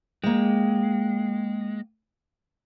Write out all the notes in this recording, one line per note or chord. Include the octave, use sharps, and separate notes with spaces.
G#3 A#3 G5